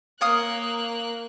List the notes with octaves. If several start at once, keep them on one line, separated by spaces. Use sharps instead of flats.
A#3 C#5 F5 D#6 F#6